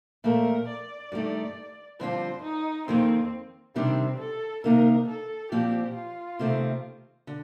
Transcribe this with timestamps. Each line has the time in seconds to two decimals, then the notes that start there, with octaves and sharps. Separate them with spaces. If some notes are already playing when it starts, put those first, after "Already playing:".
0.24 A#2 F3 A3 A#4
0.68 D5
1.12 G2 D#3 A3 D#4
2.00 G2 D3 F3 C4 F4 C5
2.43 D#4
2.88 F2 D#3 A#3 C4
3.75 C3 D#3 G3 C4 D4
4.19 A4
4.64 C3 D#3 A#3 D#4 A#4
5.08 A4
5.52 A#2 F3 C4 G4
5.95 F4
6.39 C3 D#3 A3 C4
7.27 D3